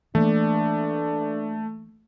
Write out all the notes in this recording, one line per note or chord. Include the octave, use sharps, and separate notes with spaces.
E3 A3 A#3 D4